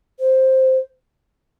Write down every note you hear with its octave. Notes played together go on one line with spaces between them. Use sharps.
C5